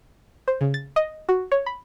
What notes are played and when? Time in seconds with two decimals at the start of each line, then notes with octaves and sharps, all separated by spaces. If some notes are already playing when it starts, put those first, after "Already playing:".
0.48 C5
0.61 C#3
0.74 A6
0.96 D#5
1.29 F#4
1.52 C#5
1.66 B5